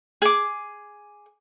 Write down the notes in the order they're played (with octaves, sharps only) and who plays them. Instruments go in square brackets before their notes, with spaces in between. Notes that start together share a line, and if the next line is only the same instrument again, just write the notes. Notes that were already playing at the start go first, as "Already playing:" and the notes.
[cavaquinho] G#4 D6